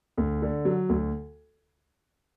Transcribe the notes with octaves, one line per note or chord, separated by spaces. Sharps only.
D2
D3
F#3
D2